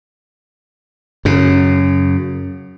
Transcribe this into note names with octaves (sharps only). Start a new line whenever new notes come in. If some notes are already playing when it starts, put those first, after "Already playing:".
F#2 C#3